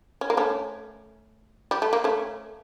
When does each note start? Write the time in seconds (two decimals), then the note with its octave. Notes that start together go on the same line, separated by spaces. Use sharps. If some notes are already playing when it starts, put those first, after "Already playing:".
0.21 C#4
0.30 A#3
0.37 A3 C#4
1.71 G3
1.82 A3
1.93 A#3
2.04 A3 C#4